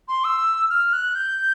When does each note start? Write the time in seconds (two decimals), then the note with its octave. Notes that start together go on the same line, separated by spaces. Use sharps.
0.08 C6
0.24 E6
0.70 F6
0.93 F#6
1.15 G6